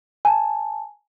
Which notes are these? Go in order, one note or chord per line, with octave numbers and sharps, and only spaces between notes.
G#5 A5